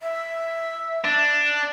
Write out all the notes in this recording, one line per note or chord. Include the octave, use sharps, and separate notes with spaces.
E5
D4